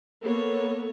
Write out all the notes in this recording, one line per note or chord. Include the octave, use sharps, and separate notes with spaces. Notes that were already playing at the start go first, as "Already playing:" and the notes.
A#3 B3 A4 C#5